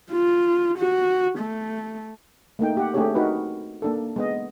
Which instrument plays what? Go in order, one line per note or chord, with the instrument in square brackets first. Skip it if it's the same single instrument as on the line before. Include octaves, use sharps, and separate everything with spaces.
[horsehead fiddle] F4
F#4
A3
[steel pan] A3 A#3 D#4 G5
G4 F#5
A3 C4 D4 G4 G#4 C#5
D#4 F#4 A#4 B4
A#3 D4 A4
G#3 B3 D#5